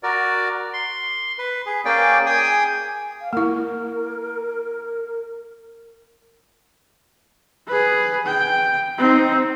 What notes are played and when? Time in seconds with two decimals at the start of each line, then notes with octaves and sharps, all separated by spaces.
0.03 F#4 A#4 D5
0.74 C6
1.39 B4
1.66 G#4
1.85 A#3 C#4 G#4 D5 G5
2.26 G#4 G5 G#5 D#6
3.21 F5
3.33 A#3 E4 A#4
7.68 G#4 B4
8.26 G5
8.98 C4 D#4